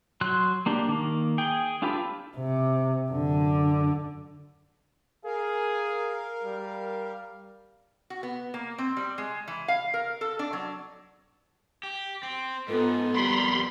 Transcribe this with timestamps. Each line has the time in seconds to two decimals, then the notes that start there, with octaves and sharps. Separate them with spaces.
0.21 F#3 C6 F#6
0.66 A#3 D4 G4
0.88 D#3 A#3
1.38 G#4 G5
1.82 D4 F4 G4 A4 B4
2.37 C3
3.11 F#2 D3
5.25 G#4 A#4 F5
6.44 G3
8.10 F#4
8.23 B3
8.54 A#3
8.78 C4
8.97 G3
9.18 G#3
9.48 E3
9.68 F5
9.94 A#4
10.21 A4
10.39 D4
10.53 F#3
11.83 G4
12.23 C4
12.68 G#2 B3 F4 A4
13.14 F2 G3 A#4 B5 C6